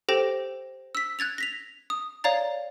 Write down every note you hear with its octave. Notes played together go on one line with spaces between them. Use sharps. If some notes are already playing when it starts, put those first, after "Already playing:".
G4 A4 C5 G5 A#6
E6 B6
F#6 G#6 A6 F7
A#6 B6 F7
D#6
C#5 D5 F5 A#5 A6